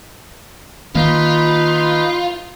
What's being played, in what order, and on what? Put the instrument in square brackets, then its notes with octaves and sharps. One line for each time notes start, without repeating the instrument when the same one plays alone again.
[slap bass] D#3 A#3 [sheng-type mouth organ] D#4 B4 [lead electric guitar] F4 [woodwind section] B5